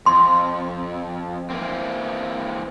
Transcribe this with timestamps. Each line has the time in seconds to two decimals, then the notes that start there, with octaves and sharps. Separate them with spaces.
0.06 F2 C6
1.50 E3 A#3 C4